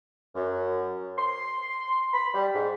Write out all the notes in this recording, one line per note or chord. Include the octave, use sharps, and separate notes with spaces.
F#2
C6
B5
G3
G#2